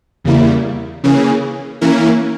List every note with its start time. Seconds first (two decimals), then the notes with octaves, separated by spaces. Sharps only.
0.24 E2 C#3 G3 A#3 E4
1.04 C#3 E3 A#3 C#4 G#4
1.81 E3 A#3 C#4 E4 A#4